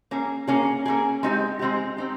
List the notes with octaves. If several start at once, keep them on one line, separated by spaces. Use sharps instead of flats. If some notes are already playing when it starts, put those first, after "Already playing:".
A#3 C#4 G#4
A#3 C#4 G#4
A#3 C#4 G#4
G#3 C4 D#4 G4
G#3 C4 D#4 G4
G#3 C4 D#4 G4